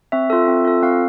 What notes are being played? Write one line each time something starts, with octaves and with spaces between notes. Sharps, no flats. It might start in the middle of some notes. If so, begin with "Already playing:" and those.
C4 E5
F4 A4
C4
F4 A4
C4 F5